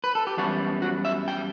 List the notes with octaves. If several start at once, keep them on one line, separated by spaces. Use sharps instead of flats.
B4
A4
G4
F#2 E3 G3 B3 F#4
F#4
E5
G5